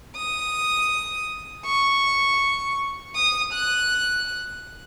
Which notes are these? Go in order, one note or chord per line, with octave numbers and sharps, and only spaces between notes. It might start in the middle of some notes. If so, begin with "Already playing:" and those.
D#6
C#6
D#6
F#6